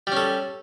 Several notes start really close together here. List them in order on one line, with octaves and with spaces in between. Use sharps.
G3 C#4 A4